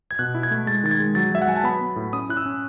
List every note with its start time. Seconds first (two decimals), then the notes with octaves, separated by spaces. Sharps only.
0.11 G#6
0.19 B2 F#6
0.35 E4
0.43 G#6
0.51 A3
0.66 G#3 A6
0.83 D#3 A6
0.91 G#6
1.00 G#3
1.15 F#3 A6
1.31 F#3 E5
1.42 F#5
1.48 F#3 G#5
1.56 A5
1.64 B3 B5
1.81 B3
1.96 A2
2.13 C#4 D#6
2.29 E4 F#6
2.37 E6
2.46 C#4